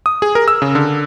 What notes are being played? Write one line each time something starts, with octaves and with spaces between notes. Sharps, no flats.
D#6
G#4
A#4
E6
C#3
D3